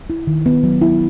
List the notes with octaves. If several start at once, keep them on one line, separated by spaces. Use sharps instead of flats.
E4
D#3
B3
F#3
E4